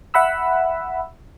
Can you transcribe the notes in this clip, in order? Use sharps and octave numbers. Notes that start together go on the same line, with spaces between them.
E5 F#5 B5 E6